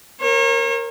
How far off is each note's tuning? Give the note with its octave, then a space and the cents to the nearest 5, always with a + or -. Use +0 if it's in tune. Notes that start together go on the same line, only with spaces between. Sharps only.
A#4 +0 C#5 -40